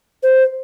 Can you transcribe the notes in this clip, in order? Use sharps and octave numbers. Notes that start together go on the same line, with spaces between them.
C5